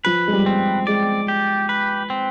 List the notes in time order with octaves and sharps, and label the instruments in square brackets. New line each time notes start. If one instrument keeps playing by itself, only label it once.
[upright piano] F3 [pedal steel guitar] B4
[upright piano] G#3
G3
[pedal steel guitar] C4
[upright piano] G#3 [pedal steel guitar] D5
[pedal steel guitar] G4
B4
C4